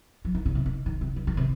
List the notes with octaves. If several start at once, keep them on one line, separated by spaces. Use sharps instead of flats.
F3
D#3
C#3
C3
D#3
D#3
C3
D#3
D#3
C3